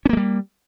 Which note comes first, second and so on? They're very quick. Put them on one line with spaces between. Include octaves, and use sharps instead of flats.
C#4 A#3 G#3 G3